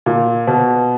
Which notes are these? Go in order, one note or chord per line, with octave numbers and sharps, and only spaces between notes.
A#2
B2